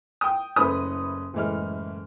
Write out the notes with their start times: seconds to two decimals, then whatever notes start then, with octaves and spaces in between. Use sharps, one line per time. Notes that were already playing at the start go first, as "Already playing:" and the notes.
0.21 G5 D#6
0.56 F#1 A3 C#4 B4 B5 D#6
1.34 F#1 A2 E3 G#3 F6